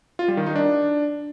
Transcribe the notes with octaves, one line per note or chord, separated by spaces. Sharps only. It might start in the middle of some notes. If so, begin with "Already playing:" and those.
F4
G3
D#3
D#4
D4